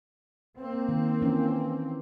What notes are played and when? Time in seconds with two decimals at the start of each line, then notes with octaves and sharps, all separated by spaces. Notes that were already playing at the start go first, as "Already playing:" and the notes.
0.58 A#3 C4
0.89 D#3
1.22 E3 C#4